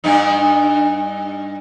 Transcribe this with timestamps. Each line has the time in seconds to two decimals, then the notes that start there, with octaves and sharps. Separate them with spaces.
0.04 G2 B3 D#4